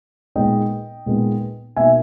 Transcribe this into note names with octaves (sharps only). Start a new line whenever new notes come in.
A#2 G#3 B3 D#4 D#5 G5
A#2 G#3 B3 D#4
B2 A#3 D#4 E5 G#5